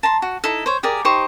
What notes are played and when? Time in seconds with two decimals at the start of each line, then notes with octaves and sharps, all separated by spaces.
0.03 A5 A#5 C6
0.22 F#4
0.44 D#4 E4 A4
0.66 C5 C#5
0.83 G4 G#4 A#4 D5
1.05 D#4 G4 C5 C#6